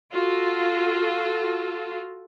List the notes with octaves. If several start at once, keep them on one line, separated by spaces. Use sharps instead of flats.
F4 F#4 A4